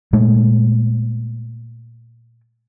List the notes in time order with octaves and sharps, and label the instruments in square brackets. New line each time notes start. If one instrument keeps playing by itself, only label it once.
[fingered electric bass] A#2 G#3 A3